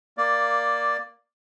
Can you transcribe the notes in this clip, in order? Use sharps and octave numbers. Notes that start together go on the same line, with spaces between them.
A#3 D5